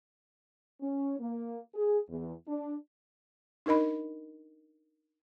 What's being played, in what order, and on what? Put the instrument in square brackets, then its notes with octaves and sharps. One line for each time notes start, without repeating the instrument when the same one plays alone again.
[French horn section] C#4
A#3
G#4
E2
D4
[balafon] D4 D#4 A#4 D#5 B5